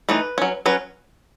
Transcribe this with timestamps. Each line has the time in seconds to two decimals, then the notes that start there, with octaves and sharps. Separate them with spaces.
0.09 E3 A3 D#4 B4
0.38 F#3 C#4
0.66 F#3 C#4 B4